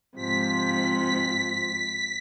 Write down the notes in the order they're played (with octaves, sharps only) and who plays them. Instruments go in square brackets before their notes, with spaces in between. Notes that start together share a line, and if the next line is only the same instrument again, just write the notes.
[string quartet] G#2 C3 F3 [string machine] B6